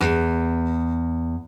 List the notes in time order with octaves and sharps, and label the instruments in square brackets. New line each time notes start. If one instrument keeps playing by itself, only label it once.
[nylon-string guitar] E2